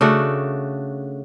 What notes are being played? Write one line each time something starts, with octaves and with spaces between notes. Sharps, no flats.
C#3 A3 D4 F#4